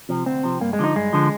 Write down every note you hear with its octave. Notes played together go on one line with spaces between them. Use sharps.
C3 F3
D2 C4
C3 F3
G2 A#3
G#3
D3 F3 D#4
G2 G#3
D3 F3